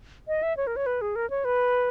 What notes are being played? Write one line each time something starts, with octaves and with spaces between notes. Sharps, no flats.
D#5
E5
C#5
A#4
C#5
B4
G#4
A#4
C#5
B4